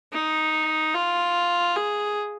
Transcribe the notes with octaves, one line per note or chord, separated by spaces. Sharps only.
D#4
F4
G#4